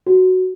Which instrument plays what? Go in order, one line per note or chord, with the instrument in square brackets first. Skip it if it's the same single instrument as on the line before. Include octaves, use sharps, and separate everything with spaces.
[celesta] F#4